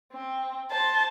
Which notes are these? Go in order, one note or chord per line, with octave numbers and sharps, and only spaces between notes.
C4
C5 A5